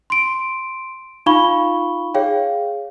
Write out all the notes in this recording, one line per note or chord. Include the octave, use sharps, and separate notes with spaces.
C6 D7
D#4 F4 F5 B5 C#6 G7
G#4 C#5 F5 G5